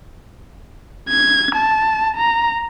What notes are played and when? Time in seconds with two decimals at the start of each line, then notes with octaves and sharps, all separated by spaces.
1.09 G#6
1.55 A5
2.17 A#5